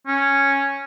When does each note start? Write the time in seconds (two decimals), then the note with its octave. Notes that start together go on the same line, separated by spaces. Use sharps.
0.07 C#4